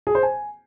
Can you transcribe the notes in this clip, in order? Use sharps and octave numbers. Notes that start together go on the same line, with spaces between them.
G#4
C5
G#5